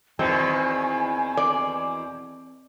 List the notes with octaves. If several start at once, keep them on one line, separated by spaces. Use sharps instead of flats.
E2 B2 D#3 C4 G#5
D5